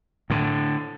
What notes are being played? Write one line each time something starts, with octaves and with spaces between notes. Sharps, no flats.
A2 D3